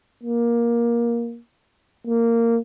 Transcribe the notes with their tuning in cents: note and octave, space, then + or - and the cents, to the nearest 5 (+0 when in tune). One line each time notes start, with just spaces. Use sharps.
A#3 +15
A#3 -15